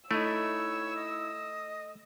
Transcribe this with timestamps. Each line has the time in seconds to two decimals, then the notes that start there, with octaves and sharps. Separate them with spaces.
0.11 A3 D#4 E4 C#5 E6
0.96 D#5